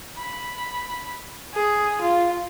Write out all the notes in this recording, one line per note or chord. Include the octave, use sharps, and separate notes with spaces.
B5
G#4
F4